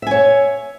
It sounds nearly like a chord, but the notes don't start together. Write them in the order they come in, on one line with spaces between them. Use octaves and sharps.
E5 G#5 C#5